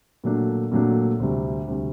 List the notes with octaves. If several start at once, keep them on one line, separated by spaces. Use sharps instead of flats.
A#2 F#3 A3 D4
A#2 F#3 A3 D4
D2 C3 G3
D2 C3 G3